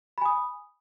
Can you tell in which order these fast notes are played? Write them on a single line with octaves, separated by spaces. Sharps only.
B5 G#5 D#6